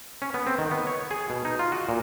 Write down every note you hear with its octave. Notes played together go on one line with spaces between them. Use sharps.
C#4
B3
C4
D#3
B3
C#5
G#4
B2
D#4
F4
F#4
A#2